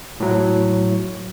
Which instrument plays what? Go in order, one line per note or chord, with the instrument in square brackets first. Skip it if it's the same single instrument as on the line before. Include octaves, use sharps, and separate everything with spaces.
[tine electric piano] A2 F#3